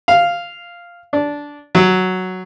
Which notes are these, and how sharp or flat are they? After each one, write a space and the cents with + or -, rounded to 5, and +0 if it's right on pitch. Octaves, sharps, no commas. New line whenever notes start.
F5 -5
D4 -10
F#3 +5